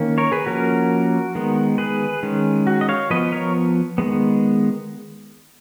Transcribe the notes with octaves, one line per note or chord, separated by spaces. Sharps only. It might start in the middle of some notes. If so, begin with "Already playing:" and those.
Already playing: D#3 A#3 C#4
A#4 C#5
G#4 B4
F3 A#3 C#4 F#4 A#4
D#3 G#3 B3
G#4 B4
D#3 G#3 C#4
F#4
D#5
C#5 F5
F3 B3 B4 D#5
A#4 C#5
D#3 G#3 B3